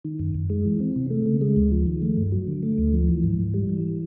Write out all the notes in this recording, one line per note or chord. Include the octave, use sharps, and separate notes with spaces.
D#3
F#2
F#2
G#3
E3
C4
C3
A3
C#3
G#3
D2
F3
D#3
A3
G2
F#3
D3
A3
D2
F3
E3
G#2
G#2
G3
E3